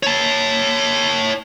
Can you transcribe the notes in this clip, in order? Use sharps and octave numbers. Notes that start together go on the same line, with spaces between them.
C#5 A5